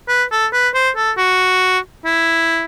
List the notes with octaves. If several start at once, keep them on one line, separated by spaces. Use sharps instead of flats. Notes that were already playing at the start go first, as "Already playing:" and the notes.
B4
A4
B4
C5
A4
F#4
E4